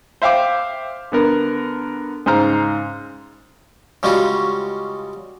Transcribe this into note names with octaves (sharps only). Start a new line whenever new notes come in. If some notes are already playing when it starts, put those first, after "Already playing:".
C5 E5 F5 G5 D6
D3 B3 A#4
G#2 C#3 C5 A#5 F6
C#3 G3 G#3 C#4 F4 F#4